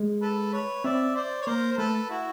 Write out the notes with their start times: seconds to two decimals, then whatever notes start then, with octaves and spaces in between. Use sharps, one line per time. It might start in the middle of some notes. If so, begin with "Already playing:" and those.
Already playing: G#3
0.21 A4 B4
0.53 B4 C#5
0.84 C4 D5 E5
1.16 C5 D5
1.42 C#5
1.46 A#3 A#4 C5
1.72 C5
1.78 A3 A4 B4
2.10 E4 F#4